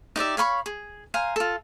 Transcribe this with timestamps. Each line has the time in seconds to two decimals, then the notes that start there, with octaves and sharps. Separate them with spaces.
0.16 D#4 G4 D5 E5
0.37 C#5 F5 B5 C#6
0.66 G#4
1.14 C5 F5 G#5 A#5
1.36 F4 A4